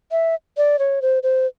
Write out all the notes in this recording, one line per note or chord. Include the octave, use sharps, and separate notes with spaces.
E5
D5
C#5
C5
C5